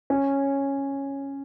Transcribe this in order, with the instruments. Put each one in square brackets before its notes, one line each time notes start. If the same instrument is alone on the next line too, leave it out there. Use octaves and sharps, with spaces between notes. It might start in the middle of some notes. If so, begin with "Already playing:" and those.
[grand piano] C#4